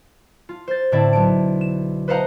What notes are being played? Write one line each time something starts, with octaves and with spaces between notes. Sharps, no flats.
F4
C5 A6
A2 D3 C4 E4 D5
B1 D7
E7
B4 C5 D#5 F5 F#5 A#5